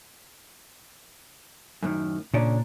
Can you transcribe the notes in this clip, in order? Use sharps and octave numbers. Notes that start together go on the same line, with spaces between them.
F#2 A2 D#3
A#2 C#3 C#4 D4